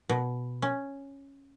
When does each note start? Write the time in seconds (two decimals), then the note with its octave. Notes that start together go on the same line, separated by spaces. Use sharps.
0.10 B2
0.62 C#4